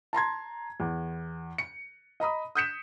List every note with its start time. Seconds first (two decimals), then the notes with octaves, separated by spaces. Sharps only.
0.13 A5 A#5 C6 G#6
0.80 E2
1.58 C#7
2.20 D#5 A#5 B5 D#6
2.55 D#6 F#6 G6 B6 C#7 E7